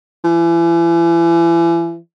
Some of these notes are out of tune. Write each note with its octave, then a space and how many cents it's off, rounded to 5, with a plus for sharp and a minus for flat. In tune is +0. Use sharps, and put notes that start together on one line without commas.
E3 +35